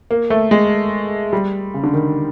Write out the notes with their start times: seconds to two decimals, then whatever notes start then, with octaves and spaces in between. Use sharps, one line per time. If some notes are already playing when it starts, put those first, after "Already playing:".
0.11 A#3
0.30 A3
0.51 G#3
1.33 G3
1.74 C#3
1.84 D3
1.93 D#3